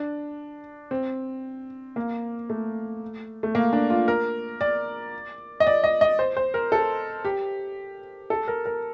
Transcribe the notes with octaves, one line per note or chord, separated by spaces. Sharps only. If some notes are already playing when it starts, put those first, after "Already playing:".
Already playing: D4
C4
A#3
A3
A3
A#3
D4
F4
A#4
D5
D#5
D5
D#5
D#5
C5
C5
A#4
A4
G4
A4
A#4
A#4